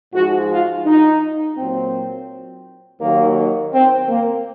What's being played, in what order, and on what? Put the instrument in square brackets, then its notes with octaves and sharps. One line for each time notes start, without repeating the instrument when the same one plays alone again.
[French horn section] G#2 F3 G#3 F#4
F4
D#4
A#2 F#3 C4
D#2 D#3 F#3 A#3
C4
A#3